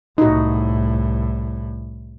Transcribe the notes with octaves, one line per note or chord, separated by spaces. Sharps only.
C2 A2 D#4 F#4